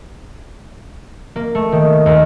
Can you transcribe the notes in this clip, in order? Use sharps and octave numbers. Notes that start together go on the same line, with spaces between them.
A#3
A3
D#3
D#2